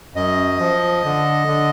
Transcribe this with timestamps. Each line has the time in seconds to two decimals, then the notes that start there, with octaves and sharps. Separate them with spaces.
0.15 F#2 D#5
0.58 F3
1.04 D3
1.48 D3